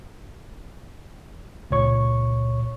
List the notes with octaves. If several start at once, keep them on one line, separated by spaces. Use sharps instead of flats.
C#2 A#2 C#5 C#6